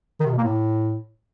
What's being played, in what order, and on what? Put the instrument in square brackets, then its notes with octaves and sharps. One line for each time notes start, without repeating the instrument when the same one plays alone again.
[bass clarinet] D#3
C3
B2
A#3
A2